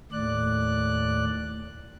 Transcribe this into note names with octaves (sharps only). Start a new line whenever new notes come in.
D#2 A2 D5 F#6